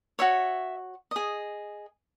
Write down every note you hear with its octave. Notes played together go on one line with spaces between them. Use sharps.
F#4 C#5 E5
G#4 D#5